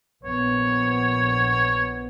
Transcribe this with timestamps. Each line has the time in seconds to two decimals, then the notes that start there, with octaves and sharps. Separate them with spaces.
0.24 A#1 B3 C#5